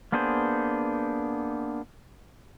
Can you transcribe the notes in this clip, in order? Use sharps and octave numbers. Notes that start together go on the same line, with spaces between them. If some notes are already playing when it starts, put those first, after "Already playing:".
A#3 B3 D4 G#4 C5